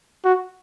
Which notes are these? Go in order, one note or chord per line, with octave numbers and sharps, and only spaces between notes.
F#4